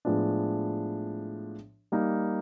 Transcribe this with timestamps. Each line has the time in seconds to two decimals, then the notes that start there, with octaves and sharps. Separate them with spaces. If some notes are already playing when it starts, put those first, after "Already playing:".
0.05 A2 F3 G#3 B3 D4
1.92 G3 A#3 D#4